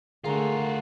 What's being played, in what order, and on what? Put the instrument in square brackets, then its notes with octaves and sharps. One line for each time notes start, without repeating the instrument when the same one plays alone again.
[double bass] D3 A3 [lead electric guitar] F4 F#4 [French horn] G#4 [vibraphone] A#4 A#5